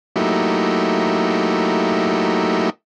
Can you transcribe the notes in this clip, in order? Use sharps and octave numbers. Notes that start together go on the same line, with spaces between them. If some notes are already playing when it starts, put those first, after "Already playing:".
F#3 A3 A#3 D#4 E4 G4